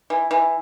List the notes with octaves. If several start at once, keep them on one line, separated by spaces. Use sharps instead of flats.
E3
E3